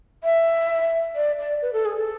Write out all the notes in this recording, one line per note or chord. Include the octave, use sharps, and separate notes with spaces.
E5
D5
D5
B4
A4
G#4
A4